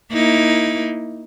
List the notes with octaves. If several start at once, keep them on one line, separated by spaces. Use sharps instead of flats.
A#3 D#4 E4